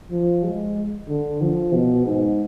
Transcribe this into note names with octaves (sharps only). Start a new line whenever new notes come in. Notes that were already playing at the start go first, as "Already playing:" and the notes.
F3
G#3
D3
F3
B2
G#2